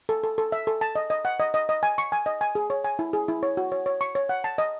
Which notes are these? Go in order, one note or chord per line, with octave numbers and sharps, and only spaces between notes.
A4
A4
A4
E5
A4
A5
D#5
D#5
F#5
D#5
D#5
D#5
G#5
C#6
G#5
D#5
G#5
G#4
C#5
G#5
E4
G#4
E4
C#5
F#4
C#5
C#5
C#6
C#5
F#5
A5
D#5